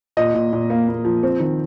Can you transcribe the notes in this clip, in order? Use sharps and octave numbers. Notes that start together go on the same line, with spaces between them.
A#2 D#5
A#2
A#2
A#3
A#3
F3
C4
D#3